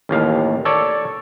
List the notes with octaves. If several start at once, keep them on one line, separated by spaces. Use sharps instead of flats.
A1 D#2 F5
A4 C#5 D5